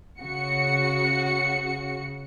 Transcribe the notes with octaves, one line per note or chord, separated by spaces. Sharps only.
C#3 F#4 C#7